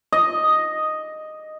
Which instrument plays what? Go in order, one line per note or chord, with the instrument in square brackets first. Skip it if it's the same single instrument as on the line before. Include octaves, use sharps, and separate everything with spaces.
[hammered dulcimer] D#5